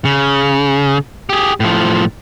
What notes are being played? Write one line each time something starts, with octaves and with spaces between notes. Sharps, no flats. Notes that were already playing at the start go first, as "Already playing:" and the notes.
C#3
G4 G#4
A2 F3